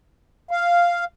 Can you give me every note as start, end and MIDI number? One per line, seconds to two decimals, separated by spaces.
0.51 1.04 77